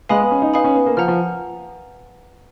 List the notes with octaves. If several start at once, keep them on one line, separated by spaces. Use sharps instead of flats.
G#3 B4 F5 G#5 B5 D#6
B3
C#4
D#4
D#4 B4 F5 G#5 B5 D#6
C#4
B3
A#3
F3 F#5 A#5 F6
F3